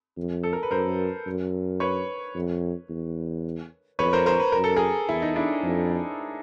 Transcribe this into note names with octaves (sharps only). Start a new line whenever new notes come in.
F2
A4
A#4
B4
F#2 A#4 C5
F#2
B4 C#5
F2
E2
F2 B4 C#5
A#4 C5
A#4 C5
B4
F#2 A#4
A4
G#4 A#4
E2 E4
D#4
D4 E4
F2